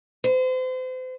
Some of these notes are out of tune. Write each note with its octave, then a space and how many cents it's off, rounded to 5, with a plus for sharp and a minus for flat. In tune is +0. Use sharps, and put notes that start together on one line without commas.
C5 -35